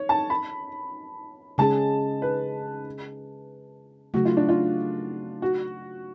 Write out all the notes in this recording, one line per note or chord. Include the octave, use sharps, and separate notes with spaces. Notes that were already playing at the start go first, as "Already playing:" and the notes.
Already playing: C#5
A5
B5
C#3 G#3 C#4 G#4 A5
B4
C#3 F#3 A3 F#4
F4
D4
F4
F#4